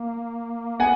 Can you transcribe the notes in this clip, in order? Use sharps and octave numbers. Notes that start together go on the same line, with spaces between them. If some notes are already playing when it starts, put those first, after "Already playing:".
Already playing: A#3
B3 F#5 G#5